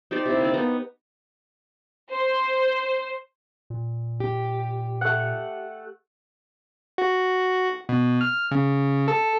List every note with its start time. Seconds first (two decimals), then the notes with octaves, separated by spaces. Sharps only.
0.11 D#4 G4 C5 D5
0.26 C3 E4
0.41 A#3 D#4 D5
0.54 B3 D#4 A#5
2.10 C5
3.70 A#2
4.20 G4
5.01 A3 F#5
6.98 F#4
7.89 B2
8.21 F6
8.51 C#3
9.08 A4